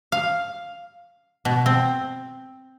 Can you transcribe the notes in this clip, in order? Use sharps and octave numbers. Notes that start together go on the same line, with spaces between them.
F5
B2
C4